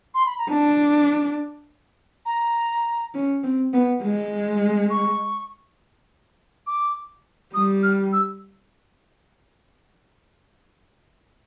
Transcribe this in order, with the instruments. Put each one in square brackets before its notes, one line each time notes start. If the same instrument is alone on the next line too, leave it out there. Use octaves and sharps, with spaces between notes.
[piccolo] C6
B5
A#5
[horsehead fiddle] D4 [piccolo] A5
[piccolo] A#5
[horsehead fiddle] C#4
C4
B3
G#3
[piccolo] C#6
D6
[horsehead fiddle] G3 [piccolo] D#6
[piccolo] F6
E6